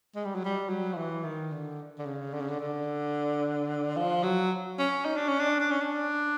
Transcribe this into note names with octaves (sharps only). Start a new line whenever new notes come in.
G#3
G3
F#3
G3
F#3
F3
E3
D#3
D3
D3
C#3
D3
C#3
D3
D3
F3
F#3
C#4
D#4
D4
C#4
D4
D4
C#4
D4